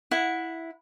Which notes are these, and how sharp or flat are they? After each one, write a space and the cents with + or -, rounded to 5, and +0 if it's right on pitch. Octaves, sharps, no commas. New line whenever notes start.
E4 +0 F#5 -15